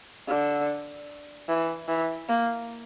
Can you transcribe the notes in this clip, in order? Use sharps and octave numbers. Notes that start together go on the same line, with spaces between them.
D3
E3
E3
A#3